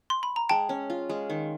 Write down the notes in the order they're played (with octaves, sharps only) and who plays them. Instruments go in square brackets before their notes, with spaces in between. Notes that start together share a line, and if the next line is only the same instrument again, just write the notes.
[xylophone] C6
B5
A#5
[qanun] G#3 [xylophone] G5 A5
[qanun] C#4
F4
G#3
D#3